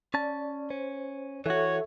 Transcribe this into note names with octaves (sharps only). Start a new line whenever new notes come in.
C#4 D5 A5
C#4 C5
E3 F#4 A4 C#5 E5